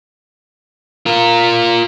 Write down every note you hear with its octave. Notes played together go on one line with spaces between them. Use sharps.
F4 A#4